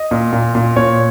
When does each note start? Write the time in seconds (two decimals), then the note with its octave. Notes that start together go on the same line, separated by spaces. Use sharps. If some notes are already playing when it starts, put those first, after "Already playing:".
Already playing: D#5
0.11 A#2
0.33 A#2
0.55 A#2
0.76 A#2 C#5